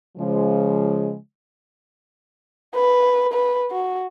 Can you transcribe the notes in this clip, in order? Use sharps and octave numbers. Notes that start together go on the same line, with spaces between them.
C#3 F3 G#3
B4
B4
F#4